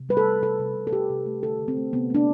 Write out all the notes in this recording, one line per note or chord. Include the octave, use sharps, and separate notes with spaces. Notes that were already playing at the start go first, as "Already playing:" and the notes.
Already playing: C3
G3 B4
A4
G3
C3 A4
C3
C3
A4
C3 G4
C3
A3
D3 A4
D3
C4
A3
C3 B3
A3 D4